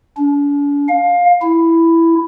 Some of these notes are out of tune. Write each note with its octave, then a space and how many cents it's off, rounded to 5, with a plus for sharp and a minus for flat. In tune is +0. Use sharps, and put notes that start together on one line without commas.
D4 -45
F5 +20
E4 +5